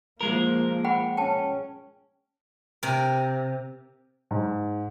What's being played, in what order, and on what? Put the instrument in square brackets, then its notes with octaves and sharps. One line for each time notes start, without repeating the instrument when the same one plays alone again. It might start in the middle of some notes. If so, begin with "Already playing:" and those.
[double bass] F3 A#3 [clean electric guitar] G#3 A#4
[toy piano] F#5 G5 B5
[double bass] C#4 [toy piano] G5 A5
[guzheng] C3 A#4
[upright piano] G#2